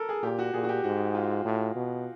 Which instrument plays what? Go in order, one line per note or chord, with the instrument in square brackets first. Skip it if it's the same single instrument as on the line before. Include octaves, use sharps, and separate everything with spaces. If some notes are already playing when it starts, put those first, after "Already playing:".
Already playing: [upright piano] A4 A#4
G#4
[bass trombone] A#2 [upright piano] G4
[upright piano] F#4
[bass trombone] A#2 [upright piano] G#4
[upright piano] F#4
G4
[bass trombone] G#2 [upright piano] F#4
[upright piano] F4
[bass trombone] A2
B2